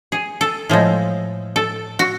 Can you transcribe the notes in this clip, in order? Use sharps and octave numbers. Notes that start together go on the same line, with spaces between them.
G#4
A4
A2 F3 G#3
A4
F#4